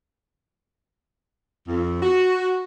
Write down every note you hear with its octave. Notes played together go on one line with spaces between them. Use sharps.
F2
F#4